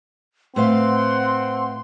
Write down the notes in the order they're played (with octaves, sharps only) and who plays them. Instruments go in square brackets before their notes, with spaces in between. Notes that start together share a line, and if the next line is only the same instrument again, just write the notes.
[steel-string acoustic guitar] A2 B4 F5 [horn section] C4 F#5 [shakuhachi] C6